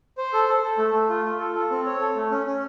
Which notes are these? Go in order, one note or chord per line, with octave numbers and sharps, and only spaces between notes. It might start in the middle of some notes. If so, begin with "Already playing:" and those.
C5
A4
A4
A4
A3
A3
F4
F4
A4
A4
C4
C#5
A4
A3
C#4
C#4